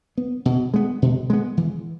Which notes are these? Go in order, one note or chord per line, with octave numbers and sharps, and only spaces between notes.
B3
B2
G#3 B3
B2
G#3 B3
E3